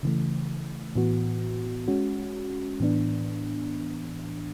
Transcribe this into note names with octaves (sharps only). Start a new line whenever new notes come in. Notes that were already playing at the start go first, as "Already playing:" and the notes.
C#3 E3 A3
A2 E3 B3 F#4
G#3 C#4 F#4
A2 E3 B3 D4